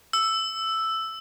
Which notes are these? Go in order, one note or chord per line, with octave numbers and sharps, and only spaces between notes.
E6